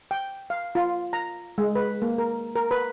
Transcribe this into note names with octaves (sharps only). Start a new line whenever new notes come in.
G5
F5
F4
A#5
G#3
B4
A#3
A#4
A#4
B4